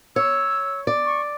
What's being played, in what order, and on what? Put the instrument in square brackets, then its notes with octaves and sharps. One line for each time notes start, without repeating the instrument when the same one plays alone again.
[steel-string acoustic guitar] C#5 [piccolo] E6
[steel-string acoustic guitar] D5
[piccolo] C#6